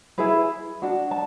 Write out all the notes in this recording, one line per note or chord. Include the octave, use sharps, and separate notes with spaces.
E4 G#4 B4
D4 F#4
A5